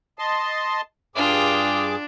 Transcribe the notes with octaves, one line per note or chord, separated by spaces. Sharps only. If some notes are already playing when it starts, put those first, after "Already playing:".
D#5 A5 C6
G2 D4 F4 G#4 G5 D6